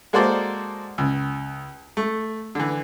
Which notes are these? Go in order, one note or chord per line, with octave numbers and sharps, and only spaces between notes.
G#3 A#3 F#4 A4 C5 D5
C#2
A3
D3 E3